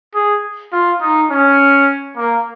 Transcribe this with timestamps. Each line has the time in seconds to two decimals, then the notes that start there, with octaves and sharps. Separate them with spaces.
0.14 G#4
0.72 F4
1.01 D#4
1.30 C#4
2.16 A#3